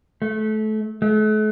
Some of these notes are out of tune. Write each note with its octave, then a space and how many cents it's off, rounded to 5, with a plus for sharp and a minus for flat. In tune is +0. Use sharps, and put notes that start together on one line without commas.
A3 -25
A3 -45